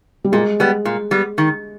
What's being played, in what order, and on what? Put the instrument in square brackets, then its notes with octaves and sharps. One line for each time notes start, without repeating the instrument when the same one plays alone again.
[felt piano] G3
[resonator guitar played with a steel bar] A#2 [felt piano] G#3
[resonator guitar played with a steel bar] G3 B3
A#2
G3 B3
D#3